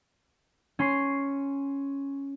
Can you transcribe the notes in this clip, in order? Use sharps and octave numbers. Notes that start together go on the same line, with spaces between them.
C#4 C6 C7